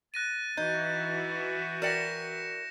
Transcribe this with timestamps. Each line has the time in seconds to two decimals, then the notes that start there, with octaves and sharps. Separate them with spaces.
0.14 F#6 A6 A#6 D#7
0.57 E3 D#4 F#4 E5 G6
1.82 A#4 D5 G5 A#6 C#7 E7